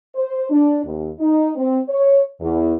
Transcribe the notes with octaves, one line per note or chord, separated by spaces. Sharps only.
C5
D4
D#2
D#4
C4
C#5
E2